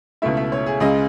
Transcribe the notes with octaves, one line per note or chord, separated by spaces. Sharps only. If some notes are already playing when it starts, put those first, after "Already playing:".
C#2 B2 A3 E4 E5
E5
C#5
G#4
C#2 C#3 G#3 D#5